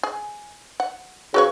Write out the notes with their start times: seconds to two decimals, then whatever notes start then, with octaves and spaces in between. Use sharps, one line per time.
0.03 G#4
0.80 F#5
1.34 C#3 F#4 B4 C#5